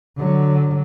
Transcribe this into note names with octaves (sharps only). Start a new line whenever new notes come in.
D3 F#3